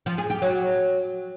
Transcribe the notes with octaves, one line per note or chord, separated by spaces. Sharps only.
F3
G#4
G4
F#3